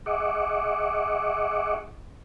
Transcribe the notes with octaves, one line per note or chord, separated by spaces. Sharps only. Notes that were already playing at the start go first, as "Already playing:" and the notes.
G#4 D#5 E5 F#5 C#6 D6